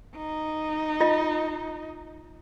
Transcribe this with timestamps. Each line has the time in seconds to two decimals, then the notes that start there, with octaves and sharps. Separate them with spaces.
0.17 D#4
1.00 F4 D#5